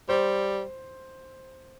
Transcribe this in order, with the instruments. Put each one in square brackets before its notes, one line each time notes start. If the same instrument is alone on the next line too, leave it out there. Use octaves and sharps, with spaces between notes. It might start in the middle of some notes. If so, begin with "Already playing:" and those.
[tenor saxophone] G3 [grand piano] C5